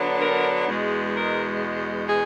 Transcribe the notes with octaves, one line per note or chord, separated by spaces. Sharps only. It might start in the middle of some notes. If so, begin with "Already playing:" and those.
Already playing: D3 F#3 B3 D4
A#4
E2 B2 G#3
A#4
G#4